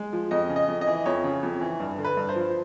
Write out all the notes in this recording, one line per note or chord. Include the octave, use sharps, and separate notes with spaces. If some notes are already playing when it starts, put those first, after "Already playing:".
Already playing: G#3
F3
F2 D#5
C#3
D#5
F2
D#5
E3
F2 C#5
C#3
F2
E3
G2
D3
B4
G2
C5
F3